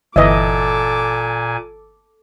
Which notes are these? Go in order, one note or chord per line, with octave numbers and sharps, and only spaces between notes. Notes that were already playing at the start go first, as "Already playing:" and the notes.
G1 A#2 E3 A4 D#5 E5 G#5 D6